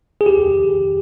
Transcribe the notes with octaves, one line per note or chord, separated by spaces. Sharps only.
G#4
G4